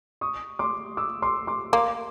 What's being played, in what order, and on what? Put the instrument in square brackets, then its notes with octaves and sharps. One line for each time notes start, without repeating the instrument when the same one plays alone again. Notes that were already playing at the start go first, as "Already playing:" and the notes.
[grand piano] C#6 D#6
C6 D6
D6 E6
C6 D6
C6 D6
[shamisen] A#3 [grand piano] C6 D6